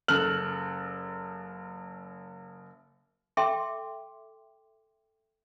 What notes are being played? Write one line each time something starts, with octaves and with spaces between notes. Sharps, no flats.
F#1 A4 F6 F#6 F#7
A4 E5 G5 C6 D6